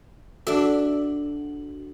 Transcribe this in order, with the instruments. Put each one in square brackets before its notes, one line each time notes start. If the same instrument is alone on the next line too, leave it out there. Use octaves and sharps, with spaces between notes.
[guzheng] D4 E5 [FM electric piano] F#4 [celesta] A4